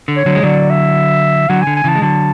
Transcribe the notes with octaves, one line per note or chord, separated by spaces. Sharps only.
D3
C#5
D3 F#3
G#3
D3 F#3 D5
E5
D3 F#3 F#5
D3 G#5
G#5
C#3 E3 A5
G#3
D3 F#3 A5